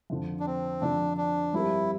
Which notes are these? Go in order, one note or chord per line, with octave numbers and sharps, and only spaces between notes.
F2 D3 F3
D4
C4
F2 D3 F3 D4
D4
G2 F3 C4 E4 G4 A#4